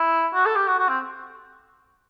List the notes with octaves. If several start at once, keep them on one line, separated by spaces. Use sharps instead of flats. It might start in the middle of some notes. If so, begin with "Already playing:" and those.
Already playing: E4
F#4
A4
G4
F#4
F#4
C4